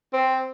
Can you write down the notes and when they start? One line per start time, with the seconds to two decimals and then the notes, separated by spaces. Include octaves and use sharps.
0.13 C4